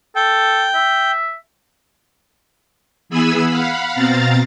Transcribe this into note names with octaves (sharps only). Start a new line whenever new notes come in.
A4 G5
E5
E3 B3 G#4 G#5 B5 E6
F5 F#5 B5
B2 C4 F5 A#5 A6